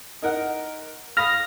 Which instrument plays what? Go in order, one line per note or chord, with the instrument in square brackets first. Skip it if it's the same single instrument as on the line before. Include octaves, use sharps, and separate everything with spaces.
[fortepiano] D#4 A#4 F#5
[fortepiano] F5 B5 D#6 [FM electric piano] F6 A#6